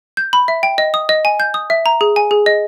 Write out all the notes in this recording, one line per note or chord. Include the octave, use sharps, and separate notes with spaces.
G6
B5
E5
G5
D#5
D#6
D#5
G#5
G6
D#6
E5
A#5
G#4
G#5
G#4
D#5